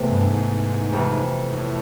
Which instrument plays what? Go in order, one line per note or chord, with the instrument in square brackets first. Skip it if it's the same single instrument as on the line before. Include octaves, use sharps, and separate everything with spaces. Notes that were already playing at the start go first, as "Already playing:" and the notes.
Already playing: [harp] E2 C3 E3 A3
[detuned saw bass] G2
G#2
[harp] F2 C3 E3
[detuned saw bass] G#2
A2